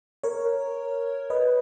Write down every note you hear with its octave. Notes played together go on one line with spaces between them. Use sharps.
A#4 C#5
B4 D#5